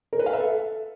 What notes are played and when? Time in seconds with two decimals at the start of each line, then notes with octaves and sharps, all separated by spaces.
0.13 A#4
0.19 B4
0.26 F5
0.33 E5
0.40 A4